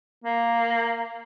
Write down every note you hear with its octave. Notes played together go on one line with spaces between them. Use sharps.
A#3